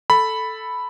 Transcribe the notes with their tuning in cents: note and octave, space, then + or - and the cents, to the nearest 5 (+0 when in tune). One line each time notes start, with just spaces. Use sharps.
A4 +0 B5 +0